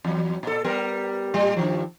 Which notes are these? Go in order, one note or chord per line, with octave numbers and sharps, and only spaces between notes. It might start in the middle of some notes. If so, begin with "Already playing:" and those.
E2 F#3
A#2 A4
G3 B3 A#4
A2 G3
G2 D#3 F3